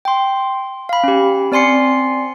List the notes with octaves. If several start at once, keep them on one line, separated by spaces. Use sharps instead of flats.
G5 C6
F5 B5
C#4 G4
C4 D5 G#5 C6 C7 C#7